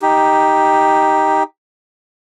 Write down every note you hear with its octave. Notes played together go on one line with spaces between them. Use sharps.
D#4 G4